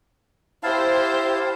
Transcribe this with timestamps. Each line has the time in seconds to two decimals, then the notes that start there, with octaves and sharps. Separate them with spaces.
0.63 E4 G4 C5 F5 A5